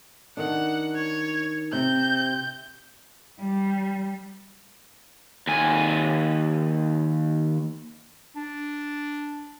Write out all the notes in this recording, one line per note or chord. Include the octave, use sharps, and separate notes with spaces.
D#3 D4 F#5
C#5
C3 G6
G3
D#2 G#5
D4